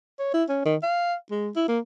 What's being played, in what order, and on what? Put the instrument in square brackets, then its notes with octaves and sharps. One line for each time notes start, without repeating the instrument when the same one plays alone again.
[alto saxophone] C#5
E4
C#4
D#3
F5
G#3
E4
A#3